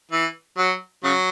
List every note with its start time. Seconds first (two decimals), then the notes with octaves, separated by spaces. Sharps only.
0.12 E3
0.58 F#3
1.04 C#3 F#3